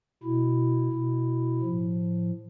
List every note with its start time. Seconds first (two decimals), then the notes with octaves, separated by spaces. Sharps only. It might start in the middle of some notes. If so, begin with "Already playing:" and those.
0.23 B2 E4
0.92 B2
1.61 A2 F3